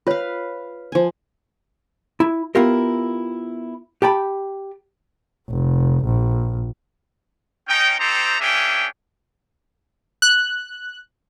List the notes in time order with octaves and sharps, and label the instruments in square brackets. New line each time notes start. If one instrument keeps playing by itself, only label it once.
[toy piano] F4 C#5 [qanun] B4 F5
[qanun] F3 G#5
[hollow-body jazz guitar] E4
B3 E4 F4 G4 A#4
G4 G5 A5 B5
[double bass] F1
A#1
[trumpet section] C#4 D#4 G5
C4 D#4 G4 A4 C5 A#5
A#3 C#4 D4 G#4 E5 G5
[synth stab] F#6